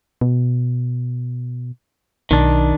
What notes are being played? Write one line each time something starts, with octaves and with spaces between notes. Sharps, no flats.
B2
B1 D#3 D4